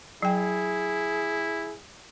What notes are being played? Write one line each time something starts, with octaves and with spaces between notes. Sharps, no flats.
F#3 E4 G#4 G5